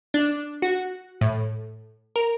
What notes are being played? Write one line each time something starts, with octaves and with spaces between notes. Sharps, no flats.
D4
F#4
A2
A#4